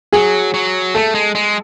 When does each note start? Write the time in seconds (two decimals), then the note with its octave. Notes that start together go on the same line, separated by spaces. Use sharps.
0.13 F#3 G#4
0.54 F#3
0.94 A3 A4
1.15 G#3
1.35 G#3